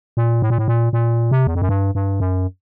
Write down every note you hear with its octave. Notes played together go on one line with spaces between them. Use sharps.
A#2
A2
A#2
A2
A#2
A#2
C3
E2
F2
F#2
G2
G2
F#2